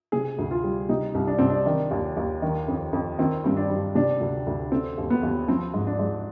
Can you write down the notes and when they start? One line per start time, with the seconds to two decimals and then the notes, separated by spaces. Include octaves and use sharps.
0.12 C3 G#4
0.38 D2
0.51 F4
0.64 G3
0.89 C3 D#4
1.14 C2
1.27 D4
1.38 C2 C4
1.50 D4
1.66 D#3
1.91 D#2
2.17 D#2
2.42 D#3
2.68 F2
2.93 F2
3.19 D#3 C4
3.44 G2 C4
3.57 D4
3.70 G2
3.95 C3 D4
4.21 D2
4.47 D2
4.72 D3 C4
4.98 D#2
5.10 B3
5.23 D#2
5.48 F3 C4
5.74 G#2
5.87 D4
5.99 G#2